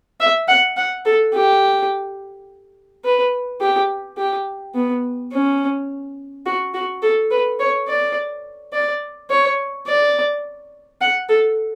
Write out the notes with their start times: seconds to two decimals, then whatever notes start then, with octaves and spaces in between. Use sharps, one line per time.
0.20 E5
0.48 F#5
0.77 F#5
1.05 A4
1.33 G4
3.04 B4
3.61 G4
4.17 G4
4.75 B3
5.32 C#4
6.46 F#4
6.74 F#4
7.02 A4
7.31 B4
7.59 C#5
7.88 D5
8.73 D5
9.30 C#5
9.87 D5
11.01 F#5
11.29 A4